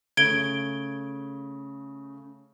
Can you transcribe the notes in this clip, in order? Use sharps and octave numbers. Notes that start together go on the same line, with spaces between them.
C#3 A3 G#6 D7 G7